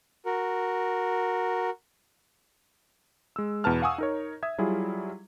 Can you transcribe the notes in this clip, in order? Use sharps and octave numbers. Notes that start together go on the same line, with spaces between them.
F#4 A#4
G#3 E6
E2 B2 B4 A5 F6
F5 F#5 G#5 C#6 D#6 E6
D#4 A#4 C#5
E5 D#6 G#6
F#3 G3 E4 F4 G#4